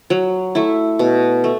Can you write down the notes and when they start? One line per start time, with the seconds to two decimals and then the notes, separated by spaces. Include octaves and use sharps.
0.10 F#3
0.55 A3 E4
0.99 B2
1.44 A3